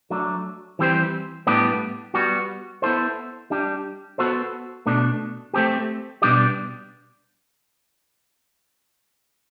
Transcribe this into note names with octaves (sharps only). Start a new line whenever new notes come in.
F#3 A3 D4
E3 G3 C4 G4 C5
A2 G3 B3 D4 G4
G3 B3 F#4
B3 E4 A4 C5
G3 D4 G4
B3 F#4 A4 C5
B2 A3 D4
A3 C4 G4
B2 G3 D4 G4 D5